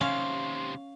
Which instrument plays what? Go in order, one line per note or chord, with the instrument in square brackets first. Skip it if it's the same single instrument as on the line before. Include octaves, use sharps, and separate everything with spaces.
[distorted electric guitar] D#2 C3 [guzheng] C#4 [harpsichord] F5 [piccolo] C6